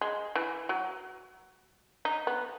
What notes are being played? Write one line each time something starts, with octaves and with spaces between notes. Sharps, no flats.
G#3
E3
F#3
D#4
B3